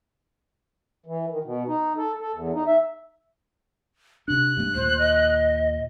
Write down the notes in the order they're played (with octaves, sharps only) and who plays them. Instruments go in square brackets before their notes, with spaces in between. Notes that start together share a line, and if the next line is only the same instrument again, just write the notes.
[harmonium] E3
D#3
B2
D#4
A4
A4
E2
D#4
E5
[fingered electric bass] C3 D4 [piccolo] F#6
[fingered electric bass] G2 A3
[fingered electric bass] D#2 A#2 [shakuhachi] C5
[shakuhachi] D#5